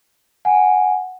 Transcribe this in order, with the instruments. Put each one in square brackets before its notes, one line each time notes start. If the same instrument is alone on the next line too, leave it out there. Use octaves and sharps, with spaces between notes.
[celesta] F#5 G#5